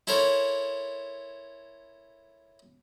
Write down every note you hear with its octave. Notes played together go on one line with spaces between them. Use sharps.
E4 A4 A#4 C5 C#5